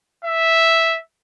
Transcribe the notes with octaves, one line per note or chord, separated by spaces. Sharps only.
E5